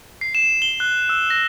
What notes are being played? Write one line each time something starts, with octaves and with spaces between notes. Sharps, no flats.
C7
E7
G7
F#6
E6
A#6